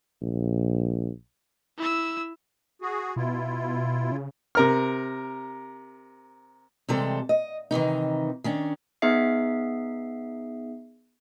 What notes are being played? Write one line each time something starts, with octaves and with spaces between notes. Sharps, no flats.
A#1
E4 E6
F#4 G#4
B2 E4 F4
C#3
C3 A#4 F6
C3 E3 G3 G#3 A4 C5
D#5
C3 D#3 E3 D#4
D#3 C#4 D4
B3 D#4 G#4 E5 C7